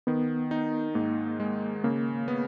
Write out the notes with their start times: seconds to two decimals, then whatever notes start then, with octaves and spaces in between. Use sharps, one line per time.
0.07 D#3 B3
0.51 D#4
0.95 G#2 A#3
1.40 G#3
1.84 C#3 A#3
2.28 B3